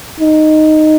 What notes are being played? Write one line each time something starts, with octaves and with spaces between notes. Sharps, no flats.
D#4